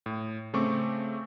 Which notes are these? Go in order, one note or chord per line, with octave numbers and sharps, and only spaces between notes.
A2
C#3 A3 C4 C#6 D6